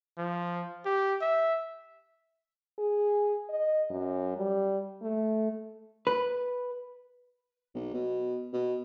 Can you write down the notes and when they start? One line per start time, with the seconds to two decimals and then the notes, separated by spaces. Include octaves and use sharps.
0.18 F3
0.86 G4
1.21 E5
2.79 G#4
3.49 D#5
3.90 F#2
4.38 G3
5.02 A3
6.07 B4
7.75 B1
7.94 B2
8.53 B2